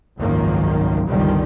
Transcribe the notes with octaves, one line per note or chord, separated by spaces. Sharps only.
G#1 C#2 F#2 D#3 F3 A#3
G1 C#2 A#2 D#3 F3 G3